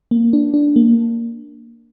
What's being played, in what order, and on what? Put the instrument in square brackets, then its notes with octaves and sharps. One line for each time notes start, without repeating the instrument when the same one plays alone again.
[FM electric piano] A#3
D4
D4
A#3